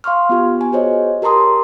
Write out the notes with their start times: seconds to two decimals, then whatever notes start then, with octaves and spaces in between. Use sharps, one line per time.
0.04 F5 C6 C#6 F6
0.29 B3 F4 G4
0.61 G#5
0.72 F#4 G#4 C5 C#5 D#5
1.22 G4 A#4 A5 A#5 C6 D#6